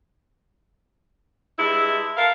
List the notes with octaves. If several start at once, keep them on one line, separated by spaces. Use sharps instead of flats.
G2 G#3 E4
A4 A#4 F5